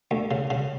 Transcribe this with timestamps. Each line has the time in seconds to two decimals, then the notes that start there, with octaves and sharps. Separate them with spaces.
0.11 D2
0.31 C#3
0.50 C#3